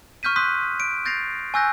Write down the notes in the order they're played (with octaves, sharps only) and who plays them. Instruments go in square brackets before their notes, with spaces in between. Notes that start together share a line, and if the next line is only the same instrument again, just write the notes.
[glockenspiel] C#6 F6 G6 B6 D#7
C6 C#6 D#6 F#6 G6 B6
D7
G6 A6 A#6 C7 D7 F7
G#5 C#6 E6 F#6 G6 A#6